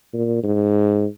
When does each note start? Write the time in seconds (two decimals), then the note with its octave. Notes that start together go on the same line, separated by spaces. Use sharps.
0.13 A#2
0.43 G#2